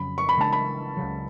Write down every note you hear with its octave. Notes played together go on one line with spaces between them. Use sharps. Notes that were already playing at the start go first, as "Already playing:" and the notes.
Already playing: F2 C#3 F#3 C#4 B5
C#6
B5
C#3 G#3 D4 A5
B5
C#2 C#3 F#3